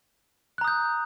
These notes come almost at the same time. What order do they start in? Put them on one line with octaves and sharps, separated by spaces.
F#6 A#5 D#6 G6